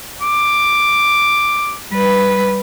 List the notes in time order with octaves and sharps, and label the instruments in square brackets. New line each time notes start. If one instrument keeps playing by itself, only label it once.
[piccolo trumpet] D6
[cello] G3 B4